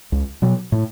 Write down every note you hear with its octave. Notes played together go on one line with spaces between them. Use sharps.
C#2
B2 F#3
A2